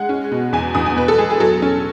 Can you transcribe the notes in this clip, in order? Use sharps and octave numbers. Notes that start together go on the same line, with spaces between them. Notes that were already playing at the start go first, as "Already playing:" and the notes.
Already playing: G#3 F#5
C#4
B2
E2 G#5
E2 D#6
G#5
B2 B4
A4
G#3 G#4
G#4
F#3 A4
C#4